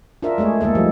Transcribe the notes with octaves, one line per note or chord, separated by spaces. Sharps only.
D4 F4 A#4 E5
G#3 A3 G#4 C#5
D#3 G#3 A#3 A4
F3 G3 A3